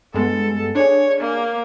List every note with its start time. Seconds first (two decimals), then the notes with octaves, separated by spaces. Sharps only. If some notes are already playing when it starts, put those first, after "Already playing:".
0.14 G2 G#3 B3 A4
0.75 D4 G#4 C#5
1.20 A#3